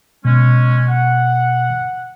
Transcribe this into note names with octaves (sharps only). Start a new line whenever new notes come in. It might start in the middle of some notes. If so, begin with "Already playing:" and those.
B2 G#3 C#4
F#5